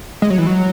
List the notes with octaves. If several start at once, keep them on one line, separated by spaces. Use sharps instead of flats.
G#3
F#3
E3
F#3